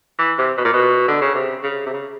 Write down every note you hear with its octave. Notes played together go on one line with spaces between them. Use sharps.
E3
C3
B2
A#2
B2
D3
C#3
C3
C#3
C3
C#3